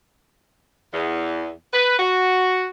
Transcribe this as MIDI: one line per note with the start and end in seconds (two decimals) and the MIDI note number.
0.93 1.50 40
1.73 1.96 71
1.99 2.67 66